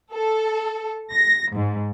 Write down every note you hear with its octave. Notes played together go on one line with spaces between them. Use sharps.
A4
A#6
G#2